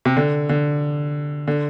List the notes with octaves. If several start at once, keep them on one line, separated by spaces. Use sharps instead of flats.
C3
D3
D3
D3